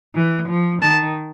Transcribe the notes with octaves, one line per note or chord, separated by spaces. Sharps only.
E3
F3
D#3 A5